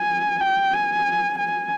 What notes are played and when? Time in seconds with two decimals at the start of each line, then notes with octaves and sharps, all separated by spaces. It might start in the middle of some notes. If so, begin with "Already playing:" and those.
Already playing: G#5
0.40 G5
0.73 G#5
1.38 G#5